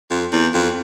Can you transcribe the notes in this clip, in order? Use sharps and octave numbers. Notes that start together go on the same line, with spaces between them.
F2
E2
F2